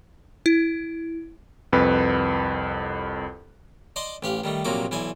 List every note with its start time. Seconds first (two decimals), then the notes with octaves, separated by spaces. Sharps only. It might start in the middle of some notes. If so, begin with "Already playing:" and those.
0.46 E4
1.72 C2 F2 B4
3.96 D5 D#5 A5 C6 D6
4.23 A1 G4 F5
4.44 D#3 G3 A3
4.65 A#1 C3 F#3 A#3 F#4 D6
4.91 B1 E3 D5 G#5